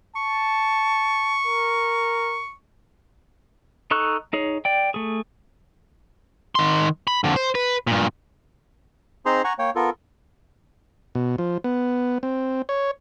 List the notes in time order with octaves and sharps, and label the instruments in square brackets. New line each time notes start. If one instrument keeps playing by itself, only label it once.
[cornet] A5 [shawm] C#6
[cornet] A#4
[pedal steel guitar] D#4 A4 C#6 F#6
D#4 G#4 C#5
D5 G5
A3 G#4
[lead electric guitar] D#3 C6
B5
F2 D3
C5
B4
G2 A#2
[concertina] C4 D#4 G#4 C5 A#5 C6
F#5 G#5 A#5 C#6
A#3 C#5 G5
B3 F4 A4 A#4
[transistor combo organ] B2
F3
B3
C4
C#5